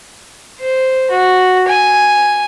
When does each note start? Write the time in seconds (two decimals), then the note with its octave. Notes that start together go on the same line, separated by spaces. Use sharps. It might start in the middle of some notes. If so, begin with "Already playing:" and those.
0.60 C5
1.11 F#4
1.68 G#5